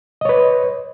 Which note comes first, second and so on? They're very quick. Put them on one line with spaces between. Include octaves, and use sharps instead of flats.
D#5 C#5 B4